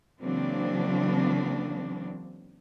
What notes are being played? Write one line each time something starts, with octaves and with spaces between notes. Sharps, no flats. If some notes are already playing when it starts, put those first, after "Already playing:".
C#3 E3 F#3 A#3 C4 D4